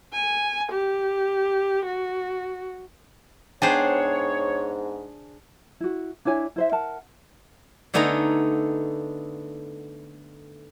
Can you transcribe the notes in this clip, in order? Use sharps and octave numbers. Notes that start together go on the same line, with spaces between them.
G#5
G4
F#4
G#2 B3 D4 G#4 C5 C#5 G5
E4 F#4
D4 E4 C#5 G#5
E4 C5 E5
A#4 F#5 A5
D3 A3 B3 D#4 G#5 A#5